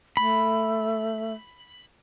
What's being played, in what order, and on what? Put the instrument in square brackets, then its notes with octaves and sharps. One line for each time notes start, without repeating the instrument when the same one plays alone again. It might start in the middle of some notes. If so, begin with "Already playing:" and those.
[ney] A3 [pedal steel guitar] B5